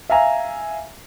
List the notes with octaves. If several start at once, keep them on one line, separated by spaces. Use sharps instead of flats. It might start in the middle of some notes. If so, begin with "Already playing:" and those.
E5 F5 G#5 A#5